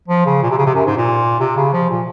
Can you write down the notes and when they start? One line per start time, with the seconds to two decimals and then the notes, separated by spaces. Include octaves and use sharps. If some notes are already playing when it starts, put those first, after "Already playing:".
0.08 F3
0.26 C#3
0.42 A#2
0.50 C3
0.58 C#3
0.66 C3
0.75 F#2
0.86 G#2
0.97 A#2
1.40 C3
1.57 C#3
1.73 F3
1.90 A#2